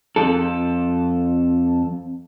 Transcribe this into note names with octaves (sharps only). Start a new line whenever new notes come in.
F2 A4